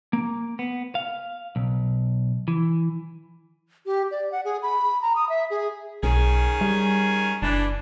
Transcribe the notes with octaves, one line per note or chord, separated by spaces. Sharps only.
A#3
B3
F5
B1
E3
G4
D5
F#5
G#4
B5
A#5
D#6
E5
G#4
B1 D#3 C#4 G#4
G3
F#1 E3 D4